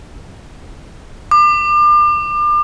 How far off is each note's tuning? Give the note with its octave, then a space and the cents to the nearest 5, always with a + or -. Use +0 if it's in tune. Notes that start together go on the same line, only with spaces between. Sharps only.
D6 +35